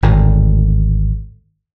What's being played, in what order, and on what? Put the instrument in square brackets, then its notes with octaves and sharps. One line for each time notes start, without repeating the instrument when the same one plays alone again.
[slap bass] G#1 D2 A2